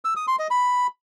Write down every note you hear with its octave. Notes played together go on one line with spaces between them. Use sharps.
E6
D#6
C6
D#5
B5